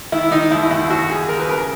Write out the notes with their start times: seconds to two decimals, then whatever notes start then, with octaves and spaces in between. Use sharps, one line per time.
0.12 D#3 E4
0.32 D#3 D#4
0.51 D#2 E4
0.71 D#2 E4
0.90 D#2 F#4
1.09 D#2 G#4
1.28 D#2 A#4
1.39 B4
1.48 C#3 A#4